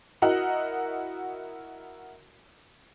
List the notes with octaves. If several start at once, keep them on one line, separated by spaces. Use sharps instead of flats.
E4 F#4 A#4 D#5 F#5